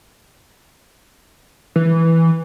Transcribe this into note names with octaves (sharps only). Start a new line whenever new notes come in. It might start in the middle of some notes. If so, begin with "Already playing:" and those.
E3